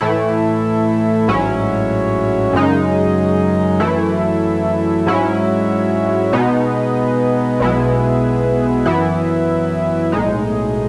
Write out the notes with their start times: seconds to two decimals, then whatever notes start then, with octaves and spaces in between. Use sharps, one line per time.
0.01 A2 E3 A3 E4
1.28 A1 G#2 F#3 C#4 E4
2.53 F#2 C#3 G#3 D#4
3.80 F#2 E3 A3 E4
5.06 G#2 F#3 C#4 E4
6.33 B2 G#3 B3 D#4
7.60 B1 B2 G#3 B3 E4
8.86 F#2 E3 B3 E4
10.12 B1 A2 G#3 D#4